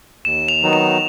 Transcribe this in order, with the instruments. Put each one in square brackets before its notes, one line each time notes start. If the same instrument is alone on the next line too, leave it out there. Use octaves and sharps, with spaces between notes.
[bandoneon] D#2 [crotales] E7
[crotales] F7
[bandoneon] D#3 F#3 B3 D#4
[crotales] E7